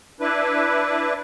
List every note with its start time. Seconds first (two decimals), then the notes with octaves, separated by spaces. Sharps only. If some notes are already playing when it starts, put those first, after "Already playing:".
0.21 D4 E4 B4